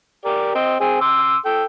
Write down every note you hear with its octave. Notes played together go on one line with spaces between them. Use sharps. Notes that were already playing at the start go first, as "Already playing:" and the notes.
G4 A#4 D5
C4 D#5
C4 G#4
C6 D6 E6
A4 G5